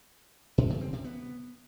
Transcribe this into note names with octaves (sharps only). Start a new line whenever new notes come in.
A#2
C#3
C4
C3
B3